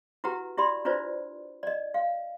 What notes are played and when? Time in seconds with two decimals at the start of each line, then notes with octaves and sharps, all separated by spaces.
0.24 E4 F#4 G4 B4 F#5 A#5
0.58 E4 G4 D5 B5 C6
0.85 D4 E4 F4 B4 C5 D5
1.63 D5 D#5
1.94 F5